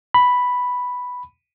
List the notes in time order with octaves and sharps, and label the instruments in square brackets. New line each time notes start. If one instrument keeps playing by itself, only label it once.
[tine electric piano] B5